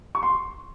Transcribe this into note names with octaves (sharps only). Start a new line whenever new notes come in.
C#6
C6